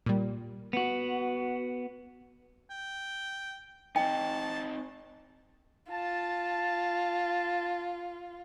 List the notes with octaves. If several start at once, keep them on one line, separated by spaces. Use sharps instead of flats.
A#2 G3
B3 F#4
G5
C4 D#4 G5 A5
F4 A5